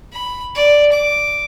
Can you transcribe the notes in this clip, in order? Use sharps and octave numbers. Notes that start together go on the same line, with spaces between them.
B5
D5
D6